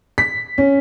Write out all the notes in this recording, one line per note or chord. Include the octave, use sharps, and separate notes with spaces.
B6
C#4